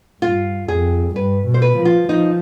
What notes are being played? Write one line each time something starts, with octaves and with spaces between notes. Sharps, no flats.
G2 F4
F2 G#4
G2 B4
B2
C5
B4
F3
F4
F3 D#4